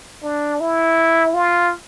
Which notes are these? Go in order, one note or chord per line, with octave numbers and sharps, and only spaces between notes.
D4
E4
F4